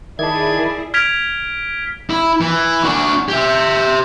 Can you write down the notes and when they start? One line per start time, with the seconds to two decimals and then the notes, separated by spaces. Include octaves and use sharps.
0.19 D#3 E4 G#4 D5 E5 A5 G#6
0.94 F6 G#6 B6 D7 F7
2.10 E4
2.41 E3
2.84 D4 F#4
3.29 G4 E5